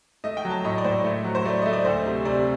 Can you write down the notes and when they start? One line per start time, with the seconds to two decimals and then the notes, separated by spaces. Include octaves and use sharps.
0.24 A3 D#5
0.37 G5
0.45 F#3
0.50 A5
0.64 A2 D#5
0.78 D5
0.84 A2 C5
0.91 D5
1.04 A3
1.24 F#3
1.35 C5
1.45 A3 D5
1.62 A3 D#5
1.73 D5
1.85 D2 C5
2.06 C3
2.25 C3 D5